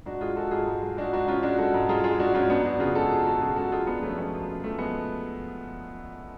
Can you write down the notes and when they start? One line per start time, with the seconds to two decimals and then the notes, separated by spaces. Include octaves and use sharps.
0.06 G#2 D4 F#4
0.21 G#3 F4 G#4
0.36 G#3 F#4 A4
0.51 G#2 F4 G#4
0.67 G#2
0.82 G#3
0.97 G#3 D4 F#4
1.13 G#2 D4 F#4
1.28 G#2 C#4 F4
1.43 G#3 D4 F#4
1.58 G#3 F#4 A4
1.74 G#2
1.89 G#2 F4 G#4
2.04 G#3 F4 G#4
2.20 G#3 D4 F#4
2.34 G#2 C#4 F4
2.50 F#2 B3 D4
2.65 F#2 D4 F#4
2.80 C#3 F4 G#4
2.95 G#3 F#4 A4
3.10 F#2 F4 G#4
3.26 F#2 F#4 A4
3.41 C#3 F4 G#4
3.56 G#3 F#4 A4
3.72 F#2 F4 G#4
3.87 F#2 B3 D4
4.02 F3 A3 C#4
4.18 G#3 B3
4.32 F#2
4.48 F#2
4.63 F3 A3
4.79 G#3 B3